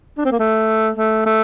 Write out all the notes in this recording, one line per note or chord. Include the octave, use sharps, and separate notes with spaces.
D4
C4
A#3
A3
A3
A3